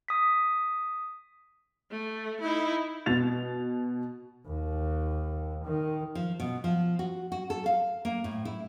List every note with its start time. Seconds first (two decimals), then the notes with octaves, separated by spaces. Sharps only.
0.08 D#6 B6
1.91 A3
2.41 D#4 E4
3.06 B2 A6 F7
4.46 D#2
5.65 D#3
6.15 F3
6.40 B2
6.64 F3
6.99 F#4
7.32 F#4
7.50 A4
7.66 F5
8.05 A#3
8.24 A2
8.45 E4